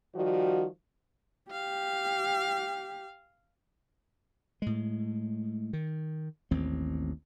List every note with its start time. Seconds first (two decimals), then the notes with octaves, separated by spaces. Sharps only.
0.16 D#3 F3 G3 F#4
1.51 G4 F5
4.62 A2 G#3
5.73 D#3
6.51 A1 D#2 C4